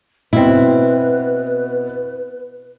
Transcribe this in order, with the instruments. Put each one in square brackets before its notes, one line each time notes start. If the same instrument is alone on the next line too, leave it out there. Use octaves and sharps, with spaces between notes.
[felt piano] B2 [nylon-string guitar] C4 E4 [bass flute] B4